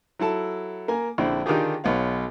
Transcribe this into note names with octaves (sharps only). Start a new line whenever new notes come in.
F#3 E4 A4 A5
A#3 A#4 G#5
A#1 D3 C4 E4
D3 D#3 D#4 F4 G4 G#4
B1 B3 C#5 F5